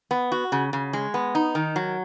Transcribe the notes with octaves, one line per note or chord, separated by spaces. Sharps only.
B3
F#4
C#3
C#3
G#3
B3
D#4
D#3
F#3